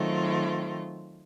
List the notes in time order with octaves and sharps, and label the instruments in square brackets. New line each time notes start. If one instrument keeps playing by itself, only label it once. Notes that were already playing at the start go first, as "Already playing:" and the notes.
Already playing: [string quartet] D#3 F#3 A3 C4 F4